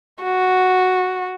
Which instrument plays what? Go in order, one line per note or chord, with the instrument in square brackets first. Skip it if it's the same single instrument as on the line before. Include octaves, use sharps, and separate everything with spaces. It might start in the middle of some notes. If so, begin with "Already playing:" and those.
[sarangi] F#4